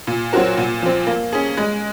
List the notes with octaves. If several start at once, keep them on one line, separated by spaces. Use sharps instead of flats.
A#2
F#3 C4 F#4 A#4
A#2
F3 C4
A#3
C#4 G#4
G#3